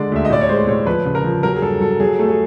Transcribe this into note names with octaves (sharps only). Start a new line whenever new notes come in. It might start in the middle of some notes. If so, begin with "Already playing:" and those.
Already playing: D3 G#3 D5
D2 E5
D#5
A2 D5
C#5
G#3 C5
A2 C#5
F3 B4
C#3
A#4
F3
F#3 A#4
G#4
G2 A4
F#3 A4
F#3 G#4
A3 A4
G#4